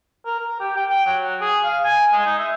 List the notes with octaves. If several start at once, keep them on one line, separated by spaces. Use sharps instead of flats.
A#4
A#4
G4
G5
G5
F#3
G#4
F5
G#5
G#3
D#4
E5